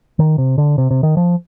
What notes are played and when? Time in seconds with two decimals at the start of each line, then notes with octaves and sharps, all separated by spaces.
0.19 D#3
0.38 C3
0.58 D3
0.78 C3
0.91 C3
1.03 D#3
1.17 F3